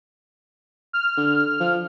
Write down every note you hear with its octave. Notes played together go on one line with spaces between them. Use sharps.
F6
D3
F3